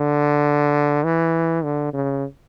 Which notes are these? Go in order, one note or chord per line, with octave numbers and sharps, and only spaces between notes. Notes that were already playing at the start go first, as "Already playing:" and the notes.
Already playing: D3
E3
D3
C#3